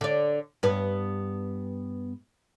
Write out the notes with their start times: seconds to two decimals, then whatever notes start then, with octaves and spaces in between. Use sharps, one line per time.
0.01 D3 D5
0.63 G2 B3